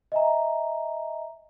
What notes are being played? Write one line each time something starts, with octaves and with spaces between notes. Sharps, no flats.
D#5 E5 G#5 A#5